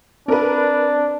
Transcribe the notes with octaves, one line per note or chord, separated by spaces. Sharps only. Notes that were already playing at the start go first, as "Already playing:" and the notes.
C4 D4 A#4 B4